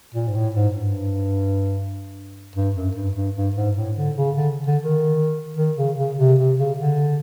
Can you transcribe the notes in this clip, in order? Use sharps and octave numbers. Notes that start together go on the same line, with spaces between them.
A#2
G#2
A2
G#2
G2
G2
F#2
G2
G2
G2
G#2
A2
D3
C#3
D3
D3
D#3
D#3
C#3
C#3
C3
C3
C#3
D3